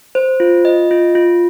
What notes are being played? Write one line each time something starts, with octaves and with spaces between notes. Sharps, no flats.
C5
F4
D#5
F4
F4